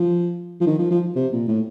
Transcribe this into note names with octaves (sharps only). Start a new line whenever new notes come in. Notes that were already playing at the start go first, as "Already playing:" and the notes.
Already playing: F3
F3
D#3
F3
F3
C3
A#2
A2